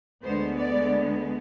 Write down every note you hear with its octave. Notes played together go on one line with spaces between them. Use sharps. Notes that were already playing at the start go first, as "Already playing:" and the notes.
D2 D3 G#3 B3 C5
D5